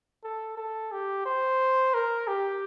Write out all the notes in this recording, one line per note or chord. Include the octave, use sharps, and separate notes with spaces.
A4
A4
G4
C5
A#4
G4